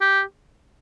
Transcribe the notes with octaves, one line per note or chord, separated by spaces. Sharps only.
G4